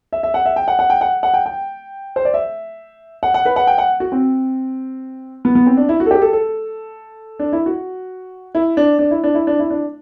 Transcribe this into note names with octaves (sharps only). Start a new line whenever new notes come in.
E5
E5
F#5
E5
G5
F#5
F#5
G5
F#5
F#5
G5
G5
C5
D5
E5
F#5
F#5
B4
F#5
G5
F#5
F#4
C4
B3
B3
C4
D4
E4
F#4
A4
G4
A4
A4
D4
E4
F#4
E4
D4
D4
E4
D4
E4
D4
E4
D4